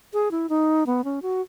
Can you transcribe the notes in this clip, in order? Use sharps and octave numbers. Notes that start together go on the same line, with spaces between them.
G#4
E4
D#4
B3
C#4
F#4